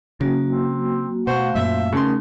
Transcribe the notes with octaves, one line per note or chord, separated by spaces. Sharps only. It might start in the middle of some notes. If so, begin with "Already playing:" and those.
C#3 F#3 A#3 F#4
C4
B2 A3 F#4 C5 F5
F#2 A#2 E5
C#3 A3 D#4 A#4 C6